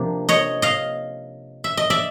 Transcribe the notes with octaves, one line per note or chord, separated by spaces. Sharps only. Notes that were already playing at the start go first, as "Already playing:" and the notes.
Already playing: C3 F3 A#3 D4
C#5 D#5
D#5 F5
E5
D#5
D5 E5